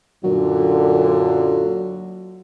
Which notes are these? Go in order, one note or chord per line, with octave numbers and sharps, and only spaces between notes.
F#2 A#2 D3 F#3